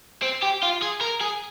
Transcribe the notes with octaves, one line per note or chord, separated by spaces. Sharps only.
C4
G4
F4
G#4
A#4
G#4